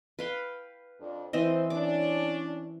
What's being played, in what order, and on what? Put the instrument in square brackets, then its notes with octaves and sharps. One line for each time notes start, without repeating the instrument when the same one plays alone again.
[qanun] B4 F5 G5
[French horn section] F2 D4
[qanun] E3 C4 D#5 [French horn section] C5
[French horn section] C#4 D4 [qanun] D6